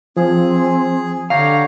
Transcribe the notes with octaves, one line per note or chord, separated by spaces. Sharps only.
F3 C4 G#4
D3 G4 C#5 F5 A#5